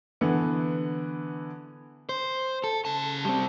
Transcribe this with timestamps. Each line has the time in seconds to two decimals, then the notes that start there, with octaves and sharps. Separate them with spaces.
0.21 D3 E3 B3
2.09 C5
2.64 A4
2.85 C#3 A5
3.25 G3 C4